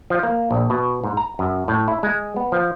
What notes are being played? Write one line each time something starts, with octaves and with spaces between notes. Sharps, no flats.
F3
A#3
A#1
B2
G#2
A#5
F#2
A2
E4
G#3
B3
F3